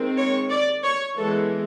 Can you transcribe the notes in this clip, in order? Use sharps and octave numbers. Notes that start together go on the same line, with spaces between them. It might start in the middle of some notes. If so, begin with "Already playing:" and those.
Already playing: D#3 G#3 C4
C#5
D5
C#5
E3 G#3 B3 A4